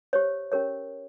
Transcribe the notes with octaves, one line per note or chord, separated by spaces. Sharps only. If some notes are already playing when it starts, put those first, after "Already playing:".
G4 C5 C#5
C#4 G4 A#4 C#5